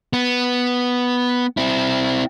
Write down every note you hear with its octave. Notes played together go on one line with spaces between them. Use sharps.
B3
C4 E4